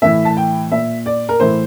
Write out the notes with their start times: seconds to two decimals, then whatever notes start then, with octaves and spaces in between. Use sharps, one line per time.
0.02 A2 E3 E5
0.25 A5
0.37 G5
0.72 A#2 E5
1.06 D5
1.29 A#4
1.40 A2 E3 C5